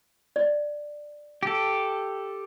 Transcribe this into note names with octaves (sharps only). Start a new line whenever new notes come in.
D5
G4 A4